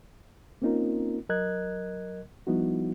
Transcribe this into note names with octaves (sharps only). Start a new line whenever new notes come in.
A#3 C4 C#4 D#4 F4 A#4
F#3 A#4 D#5 F#6 G#6
F3 G3 B3 D#4 E4 F#4